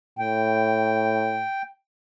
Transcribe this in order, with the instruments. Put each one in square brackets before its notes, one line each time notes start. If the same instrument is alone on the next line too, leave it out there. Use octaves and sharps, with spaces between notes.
[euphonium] A2 [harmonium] G5